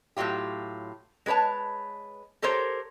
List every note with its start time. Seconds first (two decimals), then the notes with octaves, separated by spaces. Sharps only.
0.17 A2 C3 F#3 F4 G4
1.26 G#3 G#4 B4 C#5 A5
2.42 G4 A4 A#4 C5 C#5